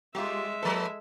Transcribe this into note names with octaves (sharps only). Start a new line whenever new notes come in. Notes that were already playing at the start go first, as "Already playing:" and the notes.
G3 G#3 F4 G4 E5
F3 A#3 A4 B4